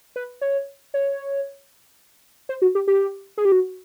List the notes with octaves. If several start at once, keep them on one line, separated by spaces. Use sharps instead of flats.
B4
C#5
C#5
C5
F#4
G4
G4
G#4
G4
F#4